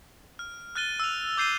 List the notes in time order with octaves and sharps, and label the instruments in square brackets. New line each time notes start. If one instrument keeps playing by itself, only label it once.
[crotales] F6
F6 F#6 A6 D#7 G7
E6 F7
D6 G6 C7 D#7 G7